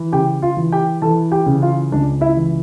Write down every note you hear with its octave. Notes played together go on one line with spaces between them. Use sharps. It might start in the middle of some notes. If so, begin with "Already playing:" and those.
Already playing: E3
C#3 G4 G5
F4 F5
E3
G4 G5
E3 A4 A5
G4 G5
C#3
F4 F5
C#2 D4 D5
E4 E5
E3